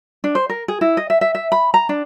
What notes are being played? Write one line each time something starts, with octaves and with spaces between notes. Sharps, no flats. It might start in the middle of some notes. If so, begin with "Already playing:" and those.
D4
C5
A#4
G#4
E4
D#5
E5
E5
E5
B5
A#5
D4